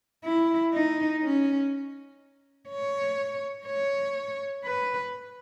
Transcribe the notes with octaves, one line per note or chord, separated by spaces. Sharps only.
E4
D#4
C#4
C#5
C#5
B4